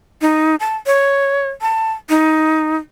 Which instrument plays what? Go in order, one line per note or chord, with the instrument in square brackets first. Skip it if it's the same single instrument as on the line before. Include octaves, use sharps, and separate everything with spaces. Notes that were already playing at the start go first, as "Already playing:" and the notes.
[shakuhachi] D#4
A5
C#5
A5
D#4